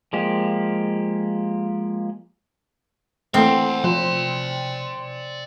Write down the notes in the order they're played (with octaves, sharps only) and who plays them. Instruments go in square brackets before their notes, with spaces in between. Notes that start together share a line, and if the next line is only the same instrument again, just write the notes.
[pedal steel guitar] F3 G#3 A#3 G4
[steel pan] E3 A3 A#3 [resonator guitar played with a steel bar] C4 [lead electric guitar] E5 F#5
[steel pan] F3 [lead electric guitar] D5 C6